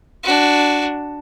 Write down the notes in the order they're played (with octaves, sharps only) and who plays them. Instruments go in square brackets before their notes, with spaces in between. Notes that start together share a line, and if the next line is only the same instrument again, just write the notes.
[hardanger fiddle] D4 F#4